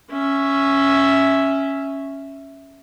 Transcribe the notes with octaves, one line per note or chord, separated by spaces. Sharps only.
C#4 E5